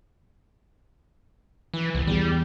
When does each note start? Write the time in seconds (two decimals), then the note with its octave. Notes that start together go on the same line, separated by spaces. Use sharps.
1.74 E3
1.95 C2
2.07 E2 G3